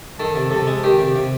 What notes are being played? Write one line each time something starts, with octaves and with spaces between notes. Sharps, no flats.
D#3 A4
C3
C3 A4
G#3
D#3 G4
C3
C3